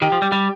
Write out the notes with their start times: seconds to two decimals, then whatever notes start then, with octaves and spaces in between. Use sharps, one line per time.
0.01 D#3 G4 G5
0.12 F3
0.22 G3
0.32 G3